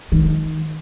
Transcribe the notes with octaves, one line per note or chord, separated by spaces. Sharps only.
D#3